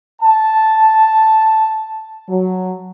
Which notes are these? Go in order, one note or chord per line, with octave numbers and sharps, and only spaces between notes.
A5
F#3